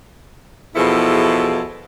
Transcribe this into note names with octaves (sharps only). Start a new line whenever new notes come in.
E2 B2 F3 E4 G#4 A4